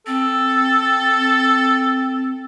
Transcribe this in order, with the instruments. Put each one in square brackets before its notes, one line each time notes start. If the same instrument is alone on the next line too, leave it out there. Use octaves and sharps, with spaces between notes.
[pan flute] C4 [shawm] A4